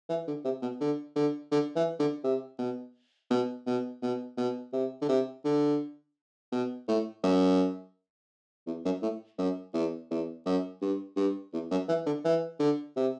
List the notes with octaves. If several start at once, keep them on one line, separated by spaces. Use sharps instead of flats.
E3
D3
C3
B2
D3
D3
D3
E3
D3
C3
B2
B2
B2
B2
B2
C3
D3
C3
D3
B2
A2
F#2
E2
F#2
A2
F#2
E2
E2
F#2
G2
G2
E2
F#2
E3
D3
E3
D3
C3